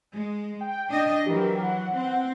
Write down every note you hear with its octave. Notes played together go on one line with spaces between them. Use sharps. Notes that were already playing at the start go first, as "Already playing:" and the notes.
G#3
G5
D4 D#5
E3 F#3 G4 A#4
F#5
C4